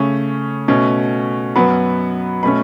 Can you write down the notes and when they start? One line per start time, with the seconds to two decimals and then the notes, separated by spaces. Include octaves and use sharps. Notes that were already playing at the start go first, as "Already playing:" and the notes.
Already playing: C#3 A3 C#4
0.68 B2 A3 C#4
1.56 F#2 F#3 B3 B5
2.43 B2 A3 C#4 B5